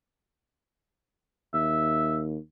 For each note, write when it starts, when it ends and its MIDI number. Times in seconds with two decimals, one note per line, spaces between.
1.54 2.37 39
1.54 2.19 76